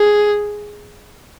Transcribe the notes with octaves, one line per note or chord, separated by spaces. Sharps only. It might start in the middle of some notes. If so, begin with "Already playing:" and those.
Already playing: G#4